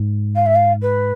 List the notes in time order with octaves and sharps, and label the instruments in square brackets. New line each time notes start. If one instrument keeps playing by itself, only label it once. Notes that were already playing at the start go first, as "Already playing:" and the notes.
Already playing: [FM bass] G#2
[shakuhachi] F5
E5
F5
B4